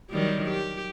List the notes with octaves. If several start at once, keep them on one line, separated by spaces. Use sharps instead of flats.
D#3 F#3 G3
G4